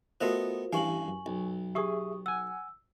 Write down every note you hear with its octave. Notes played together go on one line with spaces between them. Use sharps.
A3 B3 F4 F#4 A#4 C5 D#5
A1 G2 E3 F5 G#5 C#6 F#7
F#2
B1
G4 G#4 E5 C#6 D#6
F#5 G#5 E6